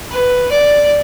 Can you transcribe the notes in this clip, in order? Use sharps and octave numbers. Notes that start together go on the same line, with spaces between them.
B4
D5